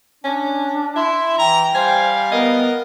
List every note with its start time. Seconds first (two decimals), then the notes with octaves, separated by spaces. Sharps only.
0.24 C#4 D4
0.96 E4 E5 C6
1.39 E3 G5 A#5
1.75 G3 C5 F5 G#5
2.32 B3 A#4 D#5